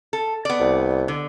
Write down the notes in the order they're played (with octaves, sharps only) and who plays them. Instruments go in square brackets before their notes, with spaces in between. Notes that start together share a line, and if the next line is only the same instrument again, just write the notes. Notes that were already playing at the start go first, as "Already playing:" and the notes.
[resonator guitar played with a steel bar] A4
B3 D5
[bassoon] C2
[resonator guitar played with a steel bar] D3